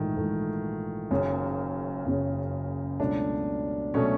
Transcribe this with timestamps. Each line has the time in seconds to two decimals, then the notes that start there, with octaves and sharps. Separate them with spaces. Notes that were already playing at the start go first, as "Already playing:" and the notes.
Already playing: A#1 G#2 D#3 E3 A3
0.17 A#1 G#2 E3 A3
1.11 F#1 F#2 C#3
2.05 F#1 F#2 C#3
2.99 C#2 B2 F#3 A3 D4
3.94 B2 F#3 A3 C#4